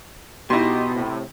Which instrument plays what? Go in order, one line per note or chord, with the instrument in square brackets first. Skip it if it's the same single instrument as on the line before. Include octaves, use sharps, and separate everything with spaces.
[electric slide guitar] B2 [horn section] D#4 G4 [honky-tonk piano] E4 C6
[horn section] A2 C3